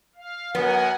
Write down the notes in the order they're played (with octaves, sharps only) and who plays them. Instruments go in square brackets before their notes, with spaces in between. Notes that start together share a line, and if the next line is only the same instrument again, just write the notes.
[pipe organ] F5
[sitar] F#2 [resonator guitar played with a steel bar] B3 [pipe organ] A#4 F#5 G#5